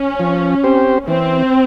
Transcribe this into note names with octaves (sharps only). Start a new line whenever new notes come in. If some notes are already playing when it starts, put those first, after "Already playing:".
Already playing: C#4
F3
C4 G4 C5
E3 C4